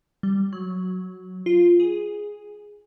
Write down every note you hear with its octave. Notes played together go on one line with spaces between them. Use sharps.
G3
F#3
F4
G#4